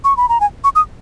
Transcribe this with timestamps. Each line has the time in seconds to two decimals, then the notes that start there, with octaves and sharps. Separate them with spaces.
0.04 C#6
0.17 B5
0.29 A#5
0.41 G#5
0.64 C#6
0.75 D#6